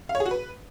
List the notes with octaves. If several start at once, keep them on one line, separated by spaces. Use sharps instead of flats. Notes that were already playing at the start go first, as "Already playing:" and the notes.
F5
C#5
G#4
F#4
B4